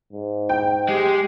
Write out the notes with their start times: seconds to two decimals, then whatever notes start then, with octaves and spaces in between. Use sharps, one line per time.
0.13 G#2
0.49 G5
0.88 G#3 G4